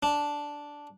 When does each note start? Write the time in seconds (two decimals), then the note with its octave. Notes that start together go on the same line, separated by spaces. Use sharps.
0.03 D4